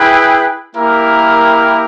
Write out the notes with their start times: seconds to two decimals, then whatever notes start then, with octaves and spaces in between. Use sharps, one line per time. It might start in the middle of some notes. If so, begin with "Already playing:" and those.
Already playing: E4 G#4 B4 G5
0.75 A#3 E4 G4 A#4